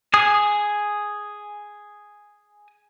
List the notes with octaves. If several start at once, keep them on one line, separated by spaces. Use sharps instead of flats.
G#4 G#5 D#6